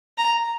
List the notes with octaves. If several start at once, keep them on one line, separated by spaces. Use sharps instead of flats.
A#5